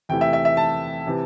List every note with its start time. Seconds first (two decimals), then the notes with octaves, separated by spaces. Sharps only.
0.09 E2 C3 A3 E4 G5
0.21 E5
0.33 E5
0.45 E5
0.57 A5
1.07 C3 E3